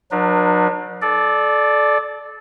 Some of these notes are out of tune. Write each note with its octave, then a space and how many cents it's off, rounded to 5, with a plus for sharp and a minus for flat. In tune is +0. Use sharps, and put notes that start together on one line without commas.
F#3 -30 D4 +40 B4 -45
A4 -25 D5 +5